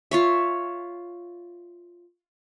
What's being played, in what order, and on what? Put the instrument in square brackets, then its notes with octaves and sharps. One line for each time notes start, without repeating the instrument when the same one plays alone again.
[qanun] F4 C#5 E5